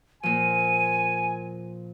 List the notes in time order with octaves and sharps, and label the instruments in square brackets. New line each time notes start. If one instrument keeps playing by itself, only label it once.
[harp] A#2 F3 [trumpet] G#5 [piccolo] D#7